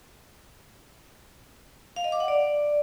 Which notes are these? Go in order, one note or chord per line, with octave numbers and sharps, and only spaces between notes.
F5
D#5
D6
F#5
D5